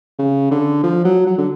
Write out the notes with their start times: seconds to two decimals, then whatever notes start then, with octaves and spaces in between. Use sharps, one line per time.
0.19 C#3
0.51 D3
0.83 F3
1.05 F#3
1.26 F#3
1.38 D3